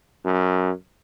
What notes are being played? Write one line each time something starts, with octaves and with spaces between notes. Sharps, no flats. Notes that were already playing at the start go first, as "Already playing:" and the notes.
F#2